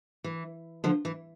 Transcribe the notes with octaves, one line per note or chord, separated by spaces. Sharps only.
E3
D3 F3
E3